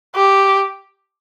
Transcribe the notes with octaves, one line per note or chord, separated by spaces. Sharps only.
G4